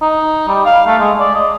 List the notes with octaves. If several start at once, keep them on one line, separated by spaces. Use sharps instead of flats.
D#4
G3
F5
A3
G#3
D5
D#5